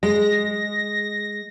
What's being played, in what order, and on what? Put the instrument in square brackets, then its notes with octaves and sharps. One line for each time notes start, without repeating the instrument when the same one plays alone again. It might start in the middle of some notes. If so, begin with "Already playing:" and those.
[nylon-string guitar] G#3 [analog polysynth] A#6